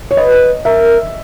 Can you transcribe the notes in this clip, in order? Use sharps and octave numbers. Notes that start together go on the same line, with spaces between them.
C#5
B4 D#5
A#4 E5